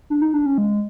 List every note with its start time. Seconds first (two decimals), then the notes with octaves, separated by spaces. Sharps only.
0.10 D4
0.21 D#4
0.34 D4
0.46 C#4
0.58 G#3